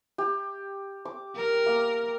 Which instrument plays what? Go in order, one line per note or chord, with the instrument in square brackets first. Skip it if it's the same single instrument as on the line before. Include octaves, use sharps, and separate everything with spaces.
[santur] G4
D6
[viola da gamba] A#4
[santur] A#3